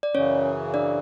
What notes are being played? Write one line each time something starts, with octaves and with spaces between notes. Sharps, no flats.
D5
F#2 C#3 E3 C#4 C#5
D4 D5